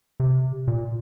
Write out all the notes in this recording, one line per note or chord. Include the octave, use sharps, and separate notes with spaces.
C3
A#2